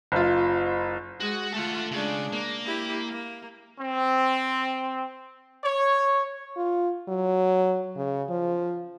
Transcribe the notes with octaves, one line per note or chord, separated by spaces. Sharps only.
F#1 F4
G#3 F#4
A3 F4 A4 F#5
C#3 G#3 D4
A#3
E4 G4
A#3
C4
C#5
F4
F#3
C#3
F3